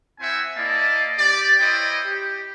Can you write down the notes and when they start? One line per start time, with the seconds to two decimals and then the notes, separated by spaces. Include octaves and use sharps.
0.20 C4 E4 C5 E5 F#5 G#5
0.56 A#3 E4 D5 D#5 F5 A5
1.18 G4 D5
1.59 E4 C5 C#5 D#5 G5 B5
2.05 G4